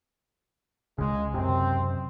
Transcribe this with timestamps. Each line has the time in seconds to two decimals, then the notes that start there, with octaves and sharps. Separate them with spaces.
0.98 C#2 C#3 G#3
1.34 F#2 C3 C4